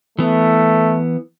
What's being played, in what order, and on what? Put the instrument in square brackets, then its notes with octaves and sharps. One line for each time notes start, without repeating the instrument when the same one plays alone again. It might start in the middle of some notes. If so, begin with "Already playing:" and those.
[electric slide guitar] E3 B3 [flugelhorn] A3